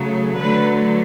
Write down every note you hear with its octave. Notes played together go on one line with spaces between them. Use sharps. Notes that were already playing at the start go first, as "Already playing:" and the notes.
Already playing: C#3 F#3 A3
D3 F#3 A3 B4